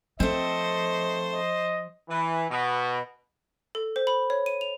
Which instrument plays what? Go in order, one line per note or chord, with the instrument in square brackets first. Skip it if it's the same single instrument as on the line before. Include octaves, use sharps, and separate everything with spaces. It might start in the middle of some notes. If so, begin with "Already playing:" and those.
[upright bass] F3 [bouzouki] A3 C4 [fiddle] C5 [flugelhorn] D#5
[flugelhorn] D#5
[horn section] E3
B2
[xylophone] A4
C5
B5
C#5
D#7
F7